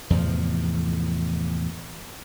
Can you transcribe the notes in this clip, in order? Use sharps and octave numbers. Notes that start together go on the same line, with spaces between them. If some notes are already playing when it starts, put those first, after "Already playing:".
E2 A2 C3 F3